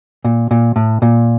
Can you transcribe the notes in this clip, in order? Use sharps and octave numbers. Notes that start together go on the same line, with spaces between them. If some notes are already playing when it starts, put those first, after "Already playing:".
A#2
A#2
A2
A#2